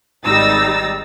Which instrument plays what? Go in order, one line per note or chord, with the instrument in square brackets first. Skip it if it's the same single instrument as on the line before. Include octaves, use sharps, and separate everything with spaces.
[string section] G#1 G3 D#4 E6 A6 A#6